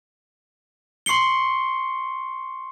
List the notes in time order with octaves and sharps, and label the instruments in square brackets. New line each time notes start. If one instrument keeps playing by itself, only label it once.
[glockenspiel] C6 C#6 C7 C#7 G7